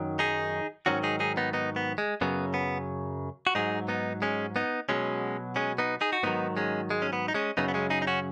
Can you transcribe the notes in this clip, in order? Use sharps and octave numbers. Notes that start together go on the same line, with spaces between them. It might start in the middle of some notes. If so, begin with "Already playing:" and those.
Already playing: F#2 D#3 F#3
D#4 G#4
G#2 D#3 F#3 C#4 F#4
D#4 G#4
D#4 G#4
B3 D#4
B3 D#4
B3
G#3
F#2 C#3 F#3 B3
B3
F#4
G#2 F#3 D#4 G#4
B3 D#4
G#3 C#4
B3 D#4
B2 F#3 G#3 C#4
G#3 C#4
B3 D#4
D#4 G#4
F#4
G#2 D#3 F#3 B3 D#4
G#3 C#4
G#3
C#4
B3
D#4
G#3 C#4
F#2 C#3 F#3 B3 D#4
B3
G#3 C#4
D#4 G#4
D#4
C#4 F#4